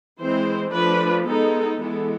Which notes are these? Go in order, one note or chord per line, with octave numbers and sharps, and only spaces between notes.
E3 G#3 C4 C5
F3 A3 D4 B4
G#3 B3 D#4 A4
E3 G#3 B3 A4